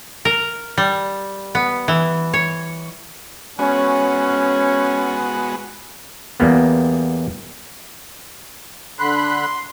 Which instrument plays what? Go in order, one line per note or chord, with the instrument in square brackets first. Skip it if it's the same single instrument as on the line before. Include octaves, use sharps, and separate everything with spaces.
[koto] A#4
G3
B3
E3
C#5
[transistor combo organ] G#3 B3 F#4 [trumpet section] C#4
[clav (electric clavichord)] E2 G3 A#3 B3
[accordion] D3 B5 F#6 [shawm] C6